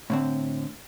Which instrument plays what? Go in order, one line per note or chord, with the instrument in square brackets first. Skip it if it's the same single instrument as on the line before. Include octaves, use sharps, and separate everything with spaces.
[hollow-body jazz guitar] A2 D3 C4